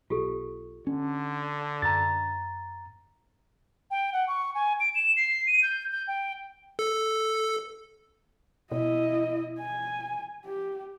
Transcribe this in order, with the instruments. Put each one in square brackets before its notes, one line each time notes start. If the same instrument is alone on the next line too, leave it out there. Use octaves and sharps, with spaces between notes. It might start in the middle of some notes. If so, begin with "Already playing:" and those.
[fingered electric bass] B1 [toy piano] F4 G4 A4
[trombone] D3 [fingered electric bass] C#4
[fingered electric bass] F#2 [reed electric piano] A#5 A6
[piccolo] G5
F#5
C#6
G#5
D7
E7
C7
D#7
G6
G6
G5
[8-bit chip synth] A4
[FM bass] B2 [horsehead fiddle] E4 D#5
[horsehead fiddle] G#5
G4